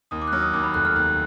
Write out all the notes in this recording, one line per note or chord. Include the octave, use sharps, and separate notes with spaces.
D#2 D#6
D6
F#6
F#3 F6
D#6
D#2 D6
B5
F1 F#6
F6
D#2 F#6